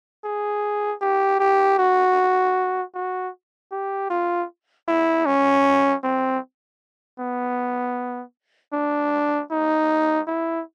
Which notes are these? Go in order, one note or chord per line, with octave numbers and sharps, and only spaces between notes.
G#4
G4
G4
F#4
F#4
G4
F4
E4
C#4
C4
B3
D4
D#4
E4